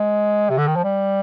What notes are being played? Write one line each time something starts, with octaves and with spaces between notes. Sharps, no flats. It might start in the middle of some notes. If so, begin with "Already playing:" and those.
Already playing: G#3
C3
D3
D#3
F3
G3